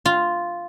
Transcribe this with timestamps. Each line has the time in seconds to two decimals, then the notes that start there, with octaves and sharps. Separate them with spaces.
0.06 F4